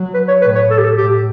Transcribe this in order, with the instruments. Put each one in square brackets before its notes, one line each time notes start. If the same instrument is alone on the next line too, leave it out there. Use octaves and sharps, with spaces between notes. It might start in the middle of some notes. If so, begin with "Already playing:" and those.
Already playing: [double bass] F#3
[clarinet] B4
C#5
[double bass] A2 [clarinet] B4
[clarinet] C#5
A4
G4
A4
[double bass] A2 [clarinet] G4